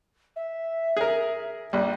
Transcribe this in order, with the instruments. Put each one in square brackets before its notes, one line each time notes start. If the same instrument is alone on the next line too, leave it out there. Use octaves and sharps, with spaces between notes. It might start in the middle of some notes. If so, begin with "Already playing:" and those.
[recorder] E5
[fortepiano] G#4 A#4
A#1 G3